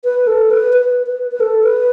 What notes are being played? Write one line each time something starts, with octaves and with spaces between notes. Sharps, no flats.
B4
A4
B4
B4
B4
B4
A4
B4